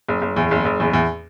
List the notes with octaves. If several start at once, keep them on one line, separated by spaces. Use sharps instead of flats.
F#1
F#1
E2
F#1
F#1
E2
E2